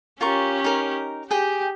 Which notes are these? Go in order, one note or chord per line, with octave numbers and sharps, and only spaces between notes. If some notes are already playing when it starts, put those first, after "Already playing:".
C#4 F4 G4 A#4 C#6
D#4 A#4
G4 G#4 G5